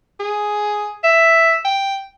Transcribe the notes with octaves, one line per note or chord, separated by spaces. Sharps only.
G#4
E5
G5